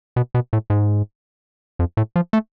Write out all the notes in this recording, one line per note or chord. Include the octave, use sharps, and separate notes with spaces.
B2
B2
A2
G#2
F2
A2
F3
A3